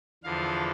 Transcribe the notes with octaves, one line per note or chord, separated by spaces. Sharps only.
E2 D3 F3 F5